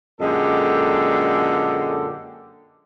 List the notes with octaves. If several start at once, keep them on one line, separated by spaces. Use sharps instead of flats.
F#2 A#2 D3 G#3 G4 A4